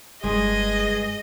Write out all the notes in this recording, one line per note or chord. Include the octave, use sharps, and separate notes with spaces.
F#1 G2 G#3 G#4 D#5